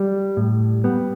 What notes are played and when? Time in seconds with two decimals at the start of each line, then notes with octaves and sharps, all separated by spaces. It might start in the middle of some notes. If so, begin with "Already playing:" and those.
Already playing: G3
0.37 A2
0.84 G3 B3